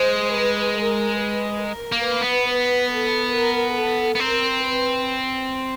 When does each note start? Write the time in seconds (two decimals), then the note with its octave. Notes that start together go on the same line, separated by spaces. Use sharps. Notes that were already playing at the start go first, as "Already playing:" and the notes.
Already playing: G#3 C5
0.35 B4
0.78 A#4
1.20 B4
1.64 A#4
1.92 A#3
2.06 B4
2.21 B3
2.50 B4
2.92 A4
3.35 A#4
3.77 A4
4.15 B3
4.20 C4 A#4
4.63 B4